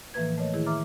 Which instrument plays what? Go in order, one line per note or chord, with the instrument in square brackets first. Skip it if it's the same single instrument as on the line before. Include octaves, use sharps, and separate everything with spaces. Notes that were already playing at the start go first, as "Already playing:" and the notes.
[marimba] A2 E3 F3 A#3 B4 G#6
A3 A#4 C#5 D#5
D#3 E4 G#4
E5 A#5 D6 F6